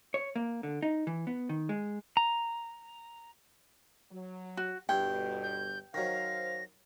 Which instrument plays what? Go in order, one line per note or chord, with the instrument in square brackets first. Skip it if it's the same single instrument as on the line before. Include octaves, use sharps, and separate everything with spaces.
[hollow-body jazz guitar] C#5
A#3
D3
D#4
E3
B3
D#3
G#3
[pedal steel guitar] A#5
[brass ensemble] F#3
[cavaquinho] F#4
[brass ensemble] G1 B2 [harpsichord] G2 E4 F#5 [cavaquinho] G5
[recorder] G6
[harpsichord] D#3 F#3 [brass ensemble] C5 F5 [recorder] A#6